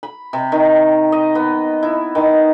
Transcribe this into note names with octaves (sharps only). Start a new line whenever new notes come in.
B5
C3
D#3
D#5
B3
E4
D#3